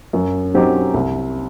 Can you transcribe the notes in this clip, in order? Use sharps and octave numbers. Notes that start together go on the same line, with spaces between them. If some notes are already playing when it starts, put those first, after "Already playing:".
F#2
F#3 C4 D#4 G4
C2